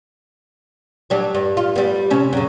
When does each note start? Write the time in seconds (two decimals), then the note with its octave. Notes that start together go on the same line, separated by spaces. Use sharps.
1.10 F#3 G3 D4
1.35 G2
1.57 F4
1.76 G3 B3
2.10 C3 C#4
2.33 F#2 C#3